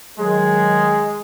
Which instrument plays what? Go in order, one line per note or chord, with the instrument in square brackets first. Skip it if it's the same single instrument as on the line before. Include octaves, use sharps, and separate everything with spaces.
[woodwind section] D#3 F#3 G#4 [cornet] G#3